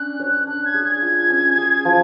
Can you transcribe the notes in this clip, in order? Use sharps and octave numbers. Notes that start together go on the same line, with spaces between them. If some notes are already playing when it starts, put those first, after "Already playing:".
Already playing: C#4 D4 F#6
C#5
D4 F#6
G#6
G#4
G#6
F4
C#4
G#4
F3